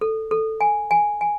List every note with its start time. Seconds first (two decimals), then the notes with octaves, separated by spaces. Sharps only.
0.01 A4
0.31 A4
0.61 G#5
0.91 G#5
1.21 G#5